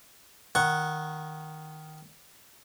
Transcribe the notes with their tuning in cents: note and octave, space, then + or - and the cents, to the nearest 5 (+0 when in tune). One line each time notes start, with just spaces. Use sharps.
D#3 +0 F#5 +0 C#6 +5